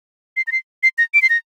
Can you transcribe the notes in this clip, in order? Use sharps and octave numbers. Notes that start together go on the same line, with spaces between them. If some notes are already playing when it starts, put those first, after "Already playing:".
C7
A#6
C7
C7
A#6
D7
C7
A#6